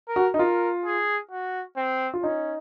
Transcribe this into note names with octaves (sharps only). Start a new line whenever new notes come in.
A#4
F#4
D#4
F4 A#4
G#4
F#4
C4
F4
C#4 D#4